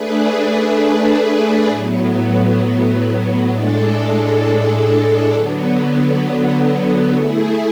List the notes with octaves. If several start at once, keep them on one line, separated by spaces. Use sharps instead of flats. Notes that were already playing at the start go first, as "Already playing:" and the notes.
Already playing: A3 D4 G#4 B4
A2 F#3 B3
A2 G#3 D4 A4
D3 F#3 B3
A3 E4 G#4